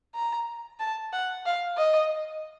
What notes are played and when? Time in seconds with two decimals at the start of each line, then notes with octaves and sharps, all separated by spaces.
0.15 A#5
0.80 A5
1.13 F#5
1.46 F5
1.77 D#5